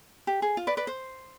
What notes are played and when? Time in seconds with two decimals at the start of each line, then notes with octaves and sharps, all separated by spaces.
0.27 G4
0.42 G#4
0.57 F4
0.67 B4 D5
0.77 B4 D5
0.87 C5